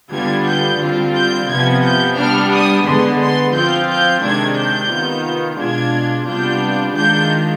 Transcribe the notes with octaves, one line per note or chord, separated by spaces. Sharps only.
D3 G3 B3 D4 F4 G#6
G6
D3 G3 C4 F4
G6
C3 F3 B3 G#6
G6
G3 B3 D4 F6
D#6
D3 G#3 B3 C6
C6
F3 C4 F4 G6
G6
C3 D#3 G#3 D4 G#6
G6
D#3 B3 F4
B2 G#3 D4 F4 G#6
C3 G3 B3 D4 F4 G6
D#3 G#3 D4 F4 G6